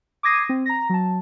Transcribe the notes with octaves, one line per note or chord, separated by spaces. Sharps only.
D6 D#6 G#6 A#6 C7 D#7
C4
A#5 A#6
F#3 A5